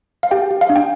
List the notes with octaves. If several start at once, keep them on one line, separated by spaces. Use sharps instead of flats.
F5
G4 G5
G4
F5
D4
G5